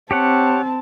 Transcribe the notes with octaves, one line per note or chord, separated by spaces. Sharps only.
C4 G4 C#5 F#5 A5